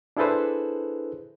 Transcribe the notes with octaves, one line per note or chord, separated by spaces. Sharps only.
D4 E4 G#4 A4 B4 C5